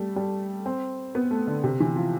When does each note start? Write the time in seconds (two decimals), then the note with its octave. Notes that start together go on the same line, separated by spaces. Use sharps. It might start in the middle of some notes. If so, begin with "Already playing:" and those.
Already playing: G3 A3
0.16 G3
0.66 C4
1.15 B3
1.31 A3
1.47 D3
1.64 C3
1.80 E3
1.96 F3